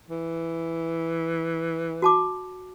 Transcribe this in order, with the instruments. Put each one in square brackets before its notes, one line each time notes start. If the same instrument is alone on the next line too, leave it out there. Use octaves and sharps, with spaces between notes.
[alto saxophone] E3
[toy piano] F#4 A5 D6